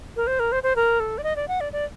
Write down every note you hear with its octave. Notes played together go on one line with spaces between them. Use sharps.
A#4
C5
A#4
C5
C5
A#4
A4
D5
D#5
D5
F#5
D5
D5